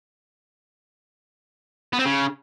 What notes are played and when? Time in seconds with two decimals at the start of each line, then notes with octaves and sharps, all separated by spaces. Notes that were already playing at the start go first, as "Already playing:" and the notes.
1.93 B3
1.99 C4
2.05 C#3